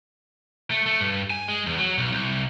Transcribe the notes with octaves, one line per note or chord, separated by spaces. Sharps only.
A3
A3
G2
G#5
G#3
E2
F#3
B1
C2